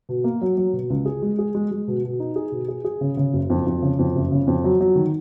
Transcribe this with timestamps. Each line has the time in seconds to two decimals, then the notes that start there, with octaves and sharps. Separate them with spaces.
0.09 B2
0.24 A#3
0.41 F#3
0.57 F#3
0.73 B2
0.90 C#2
1.06 G#4
1.22 G#3
1.39 G#4
1.55 G#3
1.71 G#3
1.88 B2
2.04 B2
2.20 D#4
2.36 G#4
2.52 B2
2.68 G#4
2.85 G#4
3.01 C#3
3.17 C#3
3.34 F#1
3.50 F2
3.67 F2
3.82 C#3
3.99 F2
4.15 F#1
4.32 C#3
4.47 F2
4.64 F#3
4.81 F#3
4.96 D#3